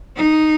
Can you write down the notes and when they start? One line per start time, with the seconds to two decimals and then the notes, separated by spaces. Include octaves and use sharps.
0.16 D#4